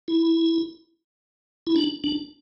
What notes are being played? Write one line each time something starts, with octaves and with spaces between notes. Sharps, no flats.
E4
E4
D4
D4